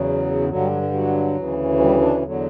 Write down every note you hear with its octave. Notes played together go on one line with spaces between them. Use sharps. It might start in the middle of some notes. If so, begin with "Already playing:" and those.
Already playing: E2 C#3 F#3
G2 D3 F#3
G3
F#3
G3
F#3
D2 C#3 E3
G3
D4
E2 D3 F#3